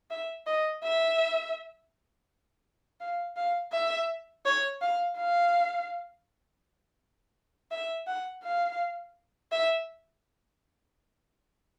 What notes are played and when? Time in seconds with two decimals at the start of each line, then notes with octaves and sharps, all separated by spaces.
0.10 E5
0.46 D#5
0.83 E5
3.01 F5
3.36 F5
3.72 E5
4.45 C#5
4.82 F5
5.17 F5
7.71 E5
8.07 F#5
8.43 F5
9.52 E5